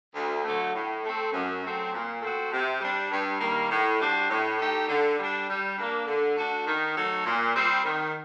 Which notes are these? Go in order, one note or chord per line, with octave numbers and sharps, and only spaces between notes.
D2
D3 F#3 A3
A2
A3 C4
F#2
F#3 A3 C4
A#2
A3 C4 F#4
C3
G3 D4
G2
D#3 G3 A#3
A2
G3 D4 F#4 C5
A2
A3 D#4 G4
D3
G3 D4
G3
A#3 D4
D3
A3 D4 F#4
D#3
F#3 A3 D#4 A4
A#2
G3 C4
D#3